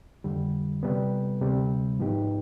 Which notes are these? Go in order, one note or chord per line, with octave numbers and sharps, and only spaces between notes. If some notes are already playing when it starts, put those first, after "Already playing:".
F2 D3 G3
C3 G3 B3
D2 C3 G3
G#2 F3 B3 D#4 G4